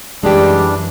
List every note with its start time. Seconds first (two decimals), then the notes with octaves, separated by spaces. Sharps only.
0.23 F#2 E3 G3 G#3 D4 G4